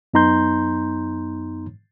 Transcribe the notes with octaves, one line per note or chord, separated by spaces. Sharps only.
F#2 B3 D#4 A#5 C6 G6